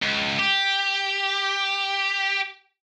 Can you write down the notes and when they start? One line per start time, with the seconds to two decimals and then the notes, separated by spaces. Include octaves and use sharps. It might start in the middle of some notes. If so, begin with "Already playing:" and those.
0.02 C#2
0.39 G4